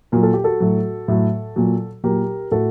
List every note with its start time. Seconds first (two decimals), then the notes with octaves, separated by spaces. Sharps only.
0.12 A#2 F#3 A#4
0.23 A4
0.34 G4
0.44 F#4 A4
0.60 A2 F#3
1.08 A2 F#3
1.56 A#2 F#3
2.04 A#2 F#3 G4 A#4
2.52 A2 F#4 A4